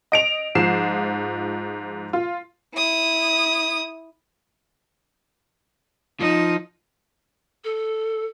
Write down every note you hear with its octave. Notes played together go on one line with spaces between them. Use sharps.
D#5 D7 F7
G#2 F3 C7 E7
F4
E4 D#6
F3 D#4
A4